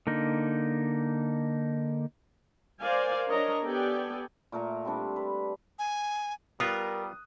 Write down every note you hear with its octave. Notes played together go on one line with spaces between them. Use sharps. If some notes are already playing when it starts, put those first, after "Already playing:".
D3 A#3 D#4
A#4 C5 D5 F5 G#5
D4 A#4 C#5 D#5 A#5
B3 G4 A4 D5 G5 G#5
A#2 A3 A#4 A#5
G3 C4 D4 A4
B4
G#5
G3 B3 F4 A#4 D#6 F#6